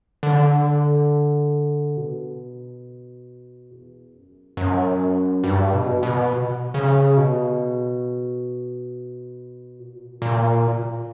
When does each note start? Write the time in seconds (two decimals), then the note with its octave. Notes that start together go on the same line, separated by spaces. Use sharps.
0.23 D3
1.97 B2
3.71 E2
4.14 F#2
4.57 F#2
5.44 G2
5.73 B2
6.03 B2
6.74 C#3
7.17 B2
9.79 A#2
9.87 B2
9.94 A#2
10.03 B2
10.11 A#2
10.22 A#2